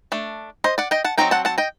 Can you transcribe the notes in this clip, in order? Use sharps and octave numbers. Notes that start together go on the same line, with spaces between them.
A3 D4
C5 D#5
D5 F#5
D#5 G5
F#5 A5
F#3 C4 D#4 G5 A#5
F#5 A5
F#5 A5
D#5 G5